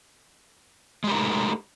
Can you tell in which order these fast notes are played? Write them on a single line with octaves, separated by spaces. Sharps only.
G#3 G4 A#4 D#4 A3